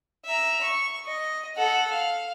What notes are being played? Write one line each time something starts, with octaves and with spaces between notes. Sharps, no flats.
E5 A#5
C#6
D#5
A4 F#5
F5